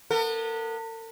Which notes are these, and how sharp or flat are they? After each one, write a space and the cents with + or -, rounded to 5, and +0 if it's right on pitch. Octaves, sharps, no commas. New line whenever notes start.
B3 -25 A4 +45